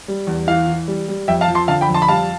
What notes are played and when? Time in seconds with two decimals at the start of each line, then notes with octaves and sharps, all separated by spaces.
0.08 G3
0.27 E2
0.47 E3 F5
0.67 E3
0.88 G3
1.08 G3
1.28 F2 E5 G5
1.41 F5 A5
1.48 F3
1.55 A5 C6
1.68 D3 F5 A5
1.81 G5 B5
1.89 F2
1.94 A5 C6
2.02 B5
2.08 G3 F5 A5